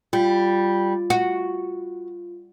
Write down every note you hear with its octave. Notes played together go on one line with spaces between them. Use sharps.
G3 F4
F#4